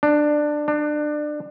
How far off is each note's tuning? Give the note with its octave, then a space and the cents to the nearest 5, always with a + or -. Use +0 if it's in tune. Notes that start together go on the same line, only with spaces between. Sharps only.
D4 +15
D4 +25